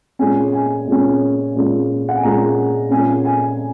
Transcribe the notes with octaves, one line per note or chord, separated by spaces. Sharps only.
A#2 G#3 C#4 G#5
G#5
A#2 G#3 C#4
A#2 G#3 C#4
F#5
G#5
A#2 G#3 C#4 A#5
A#2 G#3 C#4 G#5
G#5